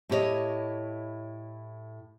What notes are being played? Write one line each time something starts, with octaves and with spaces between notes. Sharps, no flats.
A2 E4 G4 G#4 C#5 D#5